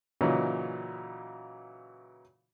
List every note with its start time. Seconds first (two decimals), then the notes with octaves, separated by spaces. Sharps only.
0.21 A#2 C#3 E3 F#3 C#4 D#4